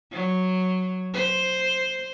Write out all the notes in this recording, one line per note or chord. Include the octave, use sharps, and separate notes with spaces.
F#3
C5